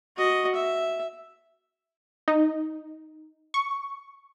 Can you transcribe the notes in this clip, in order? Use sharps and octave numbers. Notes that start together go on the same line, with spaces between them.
F#4 D#5
E5
D#4
C#6